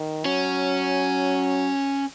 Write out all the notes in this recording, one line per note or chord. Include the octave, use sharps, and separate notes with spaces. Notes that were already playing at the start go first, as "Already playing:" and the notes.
Already playing: D#3
F#3 C#4